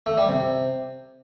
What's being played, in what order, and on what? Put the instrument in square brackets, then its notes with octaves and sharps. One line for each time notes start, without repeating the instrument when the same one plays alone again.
[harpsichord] A3
G3
C3